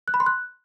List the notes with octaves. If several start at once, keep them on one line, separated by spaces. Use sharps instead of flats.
F#6
B5
C6
F#6